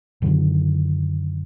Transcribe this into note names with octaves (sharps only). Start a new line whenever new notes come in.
F#2 D3 D#3 F#3